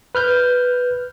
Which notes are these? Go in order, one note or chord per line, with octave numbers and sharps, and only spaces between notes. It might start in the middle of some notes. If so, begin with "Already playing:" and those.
B4 F6 G6